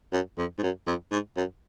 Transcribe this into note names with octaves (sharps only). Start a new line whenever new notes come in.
F#2
F2
G#2
F#2
F2
G#2
F#2